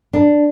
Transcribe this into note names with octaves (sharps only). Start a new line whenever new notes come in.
D4